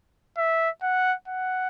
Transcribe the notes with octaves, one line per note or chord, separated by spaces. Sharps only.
E5
F#5
F#5